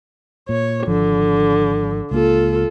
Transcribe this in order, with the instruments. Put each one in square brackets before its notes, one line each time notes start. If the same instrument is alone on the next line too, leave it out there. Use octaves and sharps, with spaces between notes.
[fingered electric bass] A#2 [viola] C#5
[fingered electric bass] G#1 F3 [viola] D3
[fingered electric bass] C#2 A#3 [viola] F4 A4